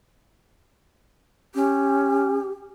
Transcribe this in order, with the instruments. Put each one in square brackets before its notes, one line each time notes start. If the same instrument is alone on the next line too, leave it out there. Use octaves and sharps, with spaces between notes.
[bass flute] C#4 [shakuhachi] G4